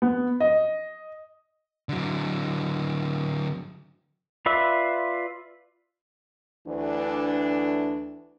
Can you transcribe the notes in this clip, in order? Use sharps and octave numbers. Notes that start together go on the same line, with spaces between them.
B3
D#5
D3 F#3
F4 B4 D5 E5
D2 E3 D4